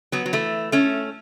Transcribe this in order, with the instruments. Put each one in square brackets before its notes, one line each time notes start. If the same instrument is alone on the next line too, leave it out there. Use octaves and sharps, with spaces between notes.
[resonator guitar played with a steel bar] F#3 B3
F#3
E3 A3
A3 C#4